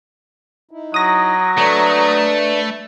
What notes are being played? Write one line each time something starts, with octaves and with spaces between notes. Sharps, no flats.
D#4 E4
F#3 D#6 A#6
A3 D4 B4 D5